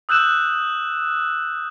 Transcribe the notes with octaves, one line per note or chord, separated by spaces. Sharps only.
D#6 E6 F#6 G6 E7